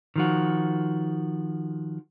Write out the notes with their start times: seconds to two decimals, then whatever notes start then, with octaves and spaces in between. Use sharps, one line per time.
0.16 D#3 F3 F#4